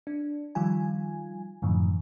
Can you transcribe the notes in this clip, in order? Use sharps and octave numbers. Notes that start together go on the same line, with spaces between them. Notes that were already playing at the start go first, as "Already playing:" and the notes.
D4
D#3 F3 G3 F4 G#5
F#2 A2 D3 E3 F3